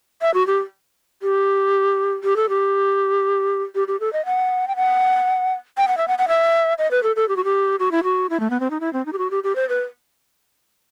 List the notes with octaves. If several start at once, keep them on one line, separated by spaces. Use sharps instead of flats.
E5
F#4
G4
G4
G4
A4
G4
G4
G4
A4
D#5
F#5
G5
F#5
G5
F#5
E5
F#5
F#5
E5
D#5
B4
A4
A4
G4
F#4
G4
F#4
E4
F#4
E4
A3
B3
C4
D#4
E4
C4
D#4
G4
F#4
G4
G4
C5
B4